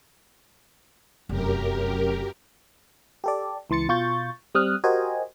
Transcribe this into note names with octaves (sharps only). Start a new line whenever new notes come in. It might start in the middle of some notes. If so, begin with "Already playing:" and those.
F1 F#2 G4 A#4
G4 A4 D5
C#2 E3 C6 A6 C#7
B2 F4 C#6 G6 A6
G3 C4 D#6 F6 F#6
F#4 G4 A#4 C5 D#5 G#5